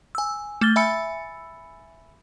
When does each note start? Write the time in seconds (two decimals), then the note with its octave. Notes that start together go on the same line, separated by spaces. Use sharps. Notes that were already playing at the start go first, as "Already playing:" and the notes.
0.15 G#5 E6
0.61 A3 F6 A6 G7
0.76 E5 G#5 B5 E6 A6 C#7